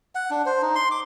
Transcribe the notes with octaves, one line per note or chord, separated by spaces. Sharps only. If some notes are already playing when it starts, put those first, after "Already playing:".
F#5
D4
C5
D#4
C6
D6